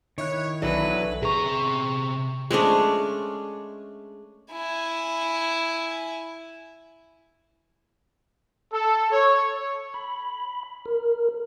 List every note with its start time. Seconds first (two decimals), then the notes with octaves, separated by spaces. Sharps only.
0.18 D#3 E4 C#5 F#6
0.62 B1 D3 E3 F#3 B4
1.22 C3 G#4 A#5 C#6
2.51 G#3 A3 C#4 D4
4.53 E4 G#5
8.72 A4
9.12 C#5
9.94 B5
10.86 A#4